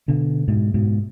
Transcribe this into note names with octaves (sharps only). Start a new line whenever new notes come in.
B2 D3
G#2 B2
G#2 B2